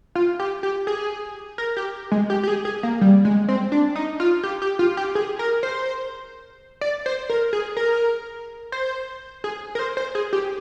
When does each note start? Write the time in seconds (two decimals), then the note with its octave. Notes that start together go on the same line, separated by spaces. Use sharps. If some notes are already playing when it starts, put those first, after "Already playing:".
0.15 F4
0.39 G4
0.63 G4
0.87 G#4
1.58 A#4
1.77 G4
2.12 G#3
2.30 G4
2.43 G4
2.47 G#4
2.65 G#4
2.83 A#3
3.01 G3
3.25 G#3
3.49 C4
3.72 D4
3.96 D#4
4.20 F4
4.43 G4
4.62 G4
4.79 F4
4.97 G4
5.15 G#4
5.39 A#4
5.63 C5
6.81 D5
7.06 C5
7.30 A#4
7.53 G#4
7.77 A#4
8.72 C5
9.44 G#4
9.75 A#4
9.79 C5
9.97 C5
10.15 G#4
10.33 G4